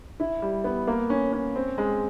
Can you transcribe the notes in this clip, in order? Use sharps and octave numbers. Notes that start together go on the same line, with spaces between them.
E4
G3
B3
A#3
C#4
C#4
C4
G#3